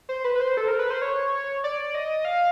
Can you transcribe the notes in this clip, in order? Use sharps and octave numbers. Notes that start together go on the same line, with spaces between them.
C5
B4
B4
C5
A4
A#4
B4
C5
C#5
D5
D#5
F5